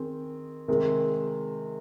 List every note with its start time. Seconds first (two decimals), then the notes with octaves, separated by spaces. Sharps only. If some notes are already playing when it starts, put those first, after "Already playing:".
Already playing: D#3 C4 G#4
0.68 C3 D#3 G#3 C4